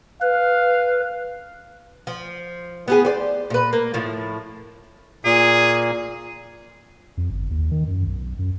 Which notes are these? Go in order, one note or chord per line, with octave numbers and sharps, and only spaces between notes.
B4 F5
F3
B3 G4 G#4
C5 D5
A#2 B4
A#3
A2 F3
A#2 G#4
F2
G1
D#2
D#3
F#2
B1
B1
F#2